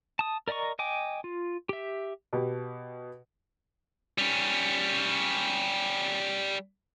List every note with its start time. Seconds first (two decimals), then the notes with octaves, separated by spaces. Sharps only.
0.19 A5 D#6
0.48 A#4 D5 D#5 A#5 C#6
0.79 D#5 G5 G#5 D6
1.24 F4
1.69 G4 E5
2.33 B2 G4
4.18 G3 C#4